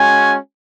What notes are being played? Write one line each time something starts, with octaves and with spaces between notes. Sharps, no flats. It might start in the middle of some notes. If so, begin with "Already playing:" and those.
Already playing: G#3 C#4 F#4 G#5